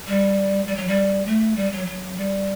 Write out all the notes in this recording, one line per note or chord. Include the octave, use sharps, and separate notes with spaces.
G3
G3
F#3
G3
A3
G3
F#3
F#3
G3